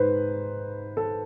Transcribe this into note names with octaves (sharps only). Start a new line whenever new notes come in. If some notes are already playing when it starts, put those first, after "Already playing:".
Already playing: G#2 B4 C5
A4